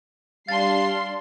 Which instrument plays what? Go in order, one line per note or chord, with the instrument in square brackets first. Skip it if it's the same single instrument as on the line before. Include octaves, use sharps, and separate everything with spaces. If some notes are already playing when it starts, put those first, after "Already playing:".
[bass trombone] G3 [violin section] D4 C6 C7 [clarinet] F5 [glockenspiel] A5 A6